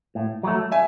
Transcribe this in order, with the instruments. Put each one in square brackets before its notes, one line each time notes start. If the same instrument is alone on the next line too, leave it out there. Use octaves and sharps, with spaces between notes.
[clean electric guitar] A2
F#3 A3
[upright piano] E5 G#5